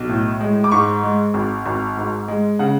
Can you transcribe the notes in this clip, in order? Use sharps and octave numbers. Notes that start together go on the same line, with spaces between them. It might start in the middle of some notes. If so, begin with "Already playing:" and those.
Already playing: B1
A2
G#3
D6
G#2 C#6
G#3
G#1
G#1
G#2
G#3
C#3 F#5